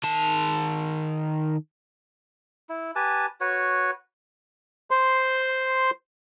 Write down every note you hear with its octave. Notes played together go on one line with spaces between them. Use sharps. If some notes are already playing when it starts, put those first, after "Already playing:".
D#3 A5
E4
G4 B4 G#5 A5
F#4 B4 C#5
C5 C6